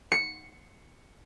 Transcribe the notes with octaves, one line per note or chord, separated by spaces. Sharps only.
C#7